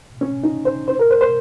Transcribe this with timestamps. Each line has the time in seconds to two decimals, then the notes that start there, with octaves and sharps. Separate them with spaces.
0.21 C#4
0.44 D#4
0.65 C5
0.88 C5
0.99 A#4
1.11 C5
1.21 C5